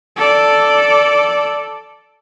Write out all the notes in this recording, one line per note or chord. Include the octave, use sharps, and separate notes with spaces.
A4 D5